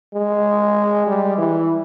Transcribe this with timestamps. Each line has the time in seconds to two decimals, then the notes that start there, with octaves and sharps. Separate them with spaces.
0.14 G#3
1.07 G3
1.38 E3